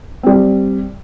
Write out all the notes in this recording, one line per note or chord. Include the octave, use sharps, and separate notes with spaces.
G3 C4